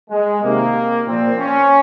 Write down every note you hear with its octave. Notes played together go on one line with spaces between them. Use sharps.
G#3
C3 D#3 A#3
A#2 F3 C4
C#4